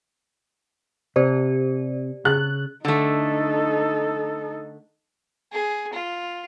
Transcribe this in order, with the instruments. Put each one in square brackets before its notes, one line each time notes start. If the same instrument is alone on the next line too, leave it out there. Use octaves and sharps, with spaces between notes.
[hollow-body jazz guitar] C3 [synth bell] G4 C5 D5
[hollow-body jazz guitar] C#3 [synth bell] G#4 [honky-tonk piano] F#6
[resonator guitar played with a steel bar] D3 A3 [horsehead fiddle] D#4 A4
[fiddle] G#4
F4